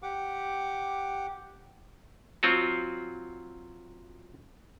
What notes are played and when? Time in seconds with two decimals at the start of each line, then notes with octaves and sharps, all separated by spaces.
0.03 G4 F#5 D6
2.43 F#3 C4 F4 F#4